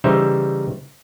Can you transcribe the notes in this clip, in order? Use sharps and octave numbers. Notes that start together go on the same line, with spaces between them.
C#3 E3 G3 D#4 C5 E5